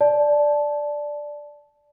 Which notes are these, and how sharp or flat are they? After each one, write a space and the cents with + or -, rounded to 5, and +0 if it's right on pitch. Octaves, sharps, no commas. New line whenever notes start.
D5 +0 A5 -15